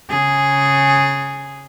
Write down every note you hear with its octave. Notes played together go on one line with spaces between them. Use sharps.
C#3 G#4